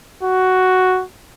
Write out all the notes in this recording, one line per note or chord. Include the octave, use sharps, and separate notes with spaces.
F#4